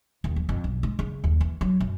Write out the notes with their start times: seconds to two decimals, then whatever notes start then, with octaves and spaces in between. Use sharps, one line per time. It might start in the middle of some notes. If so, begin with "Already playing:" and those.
0.24 D#2
0.36 F3
0.49 F2
0.64 B1
0.83 G#3
0.99 C#3
1.24 D#2
1.41 E3
1.61 F#3
1.80 F#2